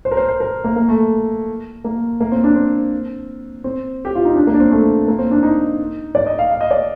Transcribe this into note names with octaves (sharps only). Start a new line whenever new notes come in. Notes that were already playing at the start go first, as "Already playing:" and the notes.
C5
A#4
C5
C5
A#4
A#3
A#3
A3
A#3
A#3
C4
D4
C4
C4
G4
F4
D#4
D4
A#3
D4
C4
A3
A#3
C4
D4
D#4
D5
D#5
F5
F5
D#5
D5